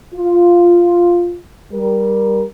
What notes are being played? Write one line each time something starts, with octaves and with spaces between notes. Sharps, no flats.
F4
G3 A#4